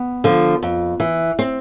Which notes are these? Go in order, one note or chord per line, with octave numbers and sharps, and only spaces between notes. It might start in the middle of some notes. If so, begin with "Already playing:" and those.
Already playing: B3
D3 F3
F2
E3
C4